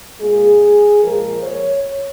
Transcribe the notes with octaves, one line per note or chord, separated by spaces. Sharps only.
A#2 G#3 G#4
A#2 F3 G#3 A#4
C#5